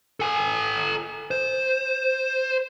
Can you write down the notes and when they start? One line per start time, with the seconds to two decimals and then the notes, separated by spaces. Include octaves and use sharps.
0.20 A4 G#5
1.31 C5